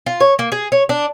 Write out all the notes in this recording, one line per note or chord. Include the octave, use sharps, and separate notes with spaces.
F4
C#5
A#3
G#4
C#5
D4